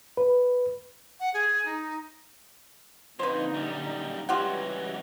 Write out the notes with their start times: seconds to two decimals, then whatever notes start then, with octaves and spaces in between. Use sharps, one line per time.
0.17 B4
1.20 F#5
1.34 G#4
1.65 D#4
3.19 F2 A#2 D3 D#4 B4 C5
3.54 F#2 G3
4.29 C#2 E3 F#3 G3 F4 G4 F#5